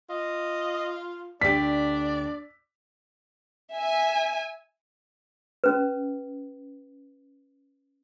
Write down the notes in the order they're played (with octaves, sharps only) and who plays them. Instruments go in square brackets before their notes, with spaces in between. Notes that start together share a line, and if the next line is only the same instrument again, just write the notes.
[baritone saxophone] F4 [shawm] D#5
[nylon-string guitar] D2 G4 [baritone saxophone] D4 [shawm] D5 [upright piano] B6
[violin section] E5 G#5
[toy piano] C#4 B4